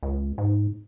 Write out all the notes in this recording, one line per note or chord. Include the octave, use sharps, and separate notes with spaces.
C#2
G#2